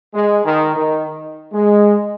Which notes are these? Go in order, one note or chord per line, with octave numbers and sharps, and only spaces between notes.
G#3
D#3
D#3
G#3